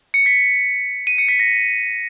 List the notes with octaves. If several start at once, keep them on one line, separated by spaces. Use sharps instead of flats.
C#7
B6
D#7
C#7
B6
A#6